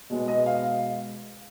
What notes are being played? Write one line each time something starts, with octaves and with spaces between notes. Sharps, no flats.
B2 G#3 B3
D#5
F5